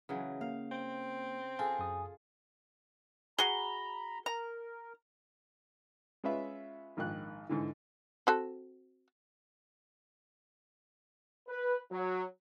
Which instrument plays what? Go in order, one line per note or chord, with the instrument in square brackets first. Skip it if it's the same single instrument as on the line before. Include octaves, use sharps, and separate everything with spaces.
[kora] C#3 E3 F#3
[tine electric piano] A#3 [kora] F5
[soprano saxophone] C4
[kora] F4 G#4 A4 [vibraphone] G#5
[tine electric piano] F#2 D#6
[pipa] F#4 G#4 [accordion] A#5 B5 [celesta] G7
[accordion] A#4 [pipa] A#5
[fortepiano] G#3 C#4 F4 B4 E5
A#1 G#2 D#3 F#6
G#2 D3 E3
[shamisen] C4 F#4 A4
[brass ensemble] B4
F#3